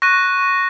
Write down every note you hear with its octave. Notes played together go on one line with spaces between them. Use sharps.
C#6 F#6 A#6 D#7